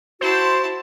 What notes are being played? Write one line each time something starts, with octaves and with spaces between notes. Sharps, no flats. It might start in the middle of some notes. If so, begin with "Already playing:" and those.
E4 F#4 C5 A5